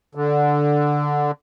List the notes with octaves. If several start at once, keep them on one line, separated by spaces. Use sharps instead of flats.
D3